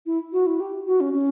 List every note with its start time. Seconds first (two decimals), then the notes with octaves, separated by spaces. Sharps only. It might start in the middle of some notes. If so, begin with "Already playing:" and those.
0.06 E4
0.33 F#4
0.47 E4
0.60 G4
0.87 F#4
1.00 C#4
1.14 C#4